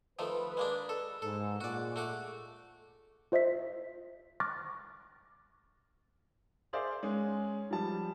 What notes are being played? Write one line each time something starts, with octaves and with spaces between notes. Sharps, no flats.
D#3 F3 A3 B4
G#3 A#3 D4
A4
G#2 A4
A#2 G#3 F#4 D5
A3 F#4 D6
F4 C5 D#5 E5 B6
C#6 D6 F6 F#6 A6 A#6
G#4 A#4 C5 D5 E5 F5
G#3 C#4 G#4
F3 G3 A5